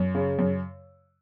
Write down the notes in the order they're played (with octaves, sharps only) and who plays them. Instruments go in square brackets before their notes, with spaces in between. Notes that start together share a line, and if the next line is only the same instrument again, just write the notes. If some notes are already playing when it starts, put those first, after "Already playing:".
Already playing: [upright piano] F#2
C#3
F#2